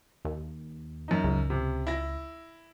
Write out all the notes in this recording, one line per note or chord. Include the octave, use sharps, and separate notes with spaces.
D#2
F#2 D#4
C#2
C3
E4 A#6